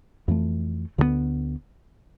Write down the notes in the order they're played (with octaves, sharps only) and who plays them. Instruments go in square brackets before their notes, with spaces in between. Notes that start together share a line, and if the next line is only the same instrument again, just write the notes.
[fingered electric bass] F2 E3 A3
D2 D3 F3 B3